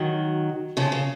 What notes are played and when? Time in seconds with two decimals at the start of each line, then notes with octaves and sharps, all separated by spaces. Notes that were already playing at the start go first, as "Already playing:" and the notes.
Already playing: D#3 F#3
0.77 C#3 F3
0.92 C#3